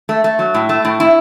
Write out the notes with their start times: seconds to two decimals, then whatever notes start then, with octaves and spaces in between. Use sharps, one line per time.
0.09 A3
0.24 A3
0.39 F#3
0.54 A2
0.69 A3
0.85 A2
1.00 E4